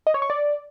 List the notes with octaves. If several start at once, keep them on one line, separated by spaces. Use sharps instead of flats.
D#5
C#5
C#6
D5